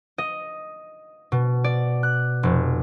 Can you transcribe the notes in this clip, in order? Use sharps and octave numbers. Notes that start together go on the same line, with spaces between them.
D#5
B2
D5
F#6
F1